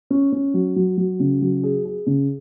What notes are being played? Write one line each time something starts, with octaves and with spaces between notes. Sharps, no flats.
C#4
C#4
F#3
F#3
F#3
C#3
F#3
G#4
G#4
C#3